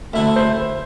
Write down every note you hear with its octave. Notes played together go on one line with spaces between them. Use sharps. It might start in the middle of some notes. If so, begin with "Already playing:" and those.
D2 D3 A3 E4 E5
C5